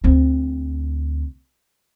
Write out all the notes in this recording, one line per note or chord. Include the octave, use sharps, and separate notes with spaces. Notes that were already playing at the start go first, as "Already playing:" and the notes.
D2 C4